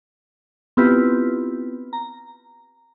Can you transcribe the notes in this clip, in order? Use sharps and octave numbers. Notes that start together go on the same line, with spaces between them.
B3 C4 E4 F4 G4 B4
A#5